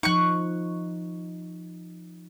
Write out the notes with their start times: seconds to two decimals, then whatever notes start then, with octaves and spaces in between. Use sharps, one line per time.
0.03 F3 D#4 C#6 F#6